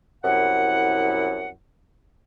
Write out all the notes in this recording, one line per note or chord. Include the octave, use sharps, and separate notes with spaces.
C2 F#2 E4 F#5